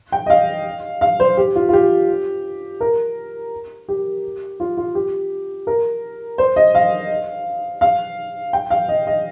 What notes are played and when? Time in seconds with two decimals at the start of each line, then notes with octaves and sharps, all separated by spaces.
0.12 G5
0.26 D#5
0.30 F5
1.01 F5
1.20 C5
1.37 G4
1.56 F4
1.69 F4
1.73 G4
2.81 A#4
3.88 G4
4.60 F4
4.77 F4
4.95 G4
5.67 A#4
6.38 C5
6.56 D#5
6.75 F5
7.81 F5
8.53 G5
8.70 F5
8.89 D#5
9.07 D#5